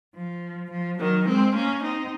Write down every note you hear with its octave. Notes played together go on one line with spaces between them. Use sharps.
F3
F3
D#3 F#3
G#3 C4
A#3 C#4
C4 D#4